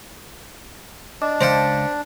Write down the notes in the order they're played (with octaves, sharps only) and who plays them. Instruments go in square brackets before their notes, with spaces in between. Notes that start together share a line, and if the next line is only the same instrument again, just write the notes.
[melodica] D4 [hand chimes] D#5 A5 D6
[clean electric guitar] C#2 F5 [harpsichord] C5 G5 A5 [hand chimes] A#6 B6 C#7